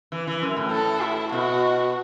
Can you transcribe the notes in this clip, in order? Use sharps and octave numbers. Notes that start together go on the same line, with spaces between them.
E3
E3
F#2
A2
A4
E4
B2 F#4